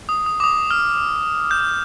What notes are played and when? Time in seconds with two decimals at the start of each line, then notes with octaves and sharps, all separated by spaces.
0.09 D#6
0.26 D#6
0.40 D6
0.44 D#6
0.71 F6
1.51 G6